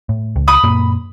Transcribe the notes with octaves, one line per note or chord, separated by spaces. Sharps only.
A2
C#2
B5 D#6
F#2 A#2 A#3